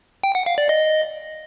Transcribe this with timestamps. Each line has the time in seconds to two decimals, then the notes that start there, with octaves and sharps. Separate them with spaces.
0.24 G5
0.35 F#5
0.46 F5
0.58 D5
0.69 D#5